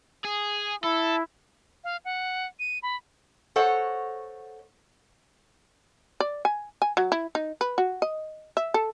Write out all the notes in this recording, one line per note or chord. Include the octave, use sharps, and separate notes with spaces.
G#4
E4 A4
F5
F#5
D#7
B5
A4 C5 C#5 D#5 F#5
D5
G#5
G#5
F#3
E4
D#4
B4
F#4
D#5
E5
A4